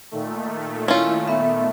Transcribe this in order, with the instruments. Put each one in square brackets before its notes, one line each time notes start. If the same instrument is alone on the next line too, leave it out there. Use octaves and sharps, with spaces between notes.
[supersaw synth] A#2 D#3 A3
[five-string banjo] C#4 F4 [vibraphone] E4 C#5
[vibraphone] B3 E5